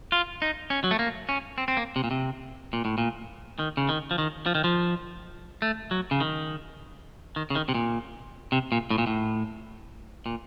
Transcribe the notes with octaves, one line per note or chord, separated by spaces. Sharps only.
F4
D#4
C#4
F#3
A3
A#3
C#4
C4
C4
A#3
C3
A#2
C3
A#2
A2
A#2
D#3
C#3
D#3
F3
D#3
F3
D#3
F3
A3
F#3
C#3
D#3
D#3
C#3
D#3
C3
A#2
C3
A#2
A2
A#2
A2
A#2